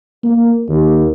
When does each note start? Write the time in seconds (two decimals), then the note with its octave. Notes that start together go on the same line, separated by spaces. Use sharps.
0.23 A#3
0.69 D#2